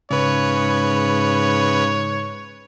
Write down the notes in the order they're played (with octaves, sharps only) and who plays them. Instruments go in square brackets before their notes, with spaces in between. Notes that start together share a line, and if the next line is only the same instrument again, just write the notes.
[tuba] G#2 [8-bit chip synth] C#3 B4 [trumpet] C#5